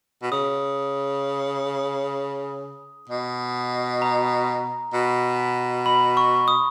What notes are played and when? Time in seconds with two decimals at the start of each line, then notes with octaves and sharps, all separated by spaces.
0.23 B2
0.32 C#3 D#6
3.09 B2
4.02 A#5
4.94 B2
5.86 B5
6.17 C#6
6.48 D#6